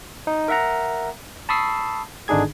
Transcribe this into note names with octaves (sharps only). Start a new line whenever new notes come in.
D#4
A#4 E5 F#5 A#5
A5 B5 C#6 D#6 E6 C7
G#1 D3 D4 D#4 G#4 G#6